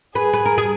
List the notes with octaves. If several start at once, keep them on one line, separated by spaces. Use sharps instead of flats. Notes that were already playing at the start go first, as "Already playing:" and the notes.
G#4 B4
B4
A#4
G#4